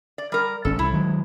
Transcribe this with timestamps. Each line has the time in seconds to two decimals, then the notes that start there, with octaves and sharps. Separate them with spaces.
0.18 D5
0.32 G3 A#4
0.65 G#1 C#4 A4
0.79 C2 E4
0.93 D#3 F#3 G#3